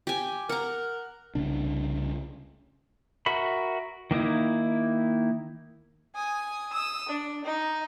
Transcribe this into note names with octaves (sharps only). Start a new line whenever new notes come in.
G4 G#5
A#4 F#5 A#5
C2 C#3 D4
F#4 A#4 E5 B5
D#3 A#3 D#4 E4
G#5 D#6
D#6 E6
D4
D#4